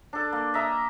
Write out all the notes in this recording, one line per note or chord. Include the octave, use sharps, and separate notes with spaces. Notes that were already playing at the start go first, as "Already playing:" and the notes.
D4 A4
A#3
D#5 E5 A#5